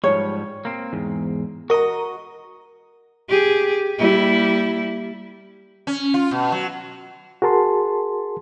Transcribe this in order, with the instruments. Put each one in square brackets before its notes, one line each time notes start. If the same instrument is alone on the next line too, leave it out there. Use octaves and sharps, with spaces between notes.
[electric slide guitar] G#2 F3 G3 [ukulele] C#5
[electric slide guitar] A#3 C4
E2 G#2
[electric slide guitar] F#4 D#5 [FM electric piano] A#4 A#5
[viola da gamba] G4 G#4
G3 A#3 E4
[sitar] C#4
F4
B2
F#3
[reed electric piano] F#4 G#4 A#4 A5 C6